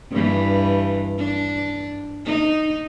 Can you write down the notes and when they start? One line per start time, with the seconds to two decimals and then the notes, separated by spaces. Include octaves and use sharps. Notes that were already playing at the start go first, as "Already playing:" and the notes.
0.11 G2 E3
1.18 D4
2.25 D#4